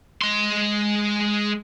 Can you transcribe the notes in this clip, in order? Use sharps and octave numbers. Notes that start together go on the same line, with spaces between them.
G#3 C6